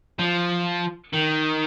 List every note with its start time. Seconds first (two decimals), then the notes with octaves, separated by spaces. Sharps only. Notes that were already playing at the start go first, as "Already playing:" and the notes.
0.19 F3
1.13 D#3